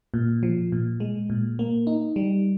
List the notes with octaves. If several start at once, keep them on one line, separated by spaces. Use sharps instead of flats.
A#2
F3
A#2
G#3
A#2
A#3
D#4
G3